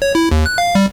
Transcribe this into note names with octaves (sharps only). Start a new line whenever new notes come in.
C#5
E4
D#2
F#6
F5
G3